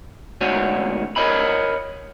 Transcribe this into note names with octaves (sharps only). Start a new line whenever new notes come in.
D2 G#2 F#4 C#5 G#5
A#4 C#5 D#5 G#5 B5